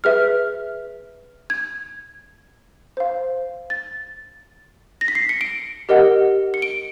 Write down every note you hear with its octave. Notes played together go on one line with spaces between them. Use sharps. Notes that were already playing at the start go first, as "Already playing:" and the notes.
G#4 B4 E5 F6
G#6
C5 F5
A6
A#6
B6
C7
C#7
D7
G4 A#4 D#5 F#5
C#7
D7